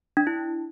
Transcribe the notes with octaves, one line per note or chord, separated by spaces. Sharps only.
D4
E4